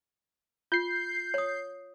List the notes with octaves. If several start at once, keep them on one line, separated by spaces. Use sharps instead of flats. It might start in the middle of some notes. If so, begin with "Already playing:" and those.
F4 G6 C7
C#5 D#6